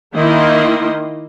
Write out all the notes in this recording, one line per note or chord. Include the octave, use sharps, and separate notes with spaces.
D#3 A#3 E4 D#5 C6